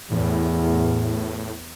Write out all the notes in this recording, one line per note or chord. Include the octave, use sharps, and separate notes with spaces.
E2 A2